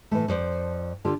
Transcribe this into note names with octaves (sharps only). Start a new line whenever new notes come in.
A2 E3 F3 A3
F2 C5 D5
D3 F4 G4 A4